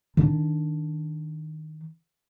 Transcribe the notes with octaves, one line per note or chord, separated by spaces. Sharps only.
D#3 D4